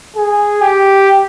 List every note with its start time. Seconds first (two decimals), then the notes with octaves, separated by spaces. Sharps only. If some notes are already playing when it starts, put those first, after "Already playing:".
0.16 G#4
0.62 G4